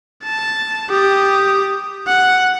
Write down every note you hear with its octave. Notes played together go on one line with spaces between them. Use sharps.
A5
G4 D#6
F#5